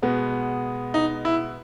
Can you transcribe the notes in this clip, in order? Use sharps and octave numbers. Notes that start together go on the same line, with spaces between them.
B2 G#3 B3
D#4
E4